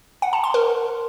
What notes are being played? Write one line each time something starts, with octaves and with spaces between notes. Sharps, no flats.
F#5
A5
C6
A#4